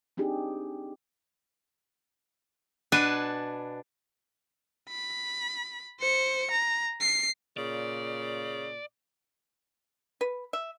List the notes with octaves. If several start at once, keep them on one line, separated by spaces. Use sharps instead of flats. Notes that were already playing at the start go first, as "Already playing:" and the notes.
C4 D4 D#4 G4 G#4
B2 D4 B4 G#5 A5
B5
C5 C#7
A#5
C7
A#2 C#3 D5
B4
E5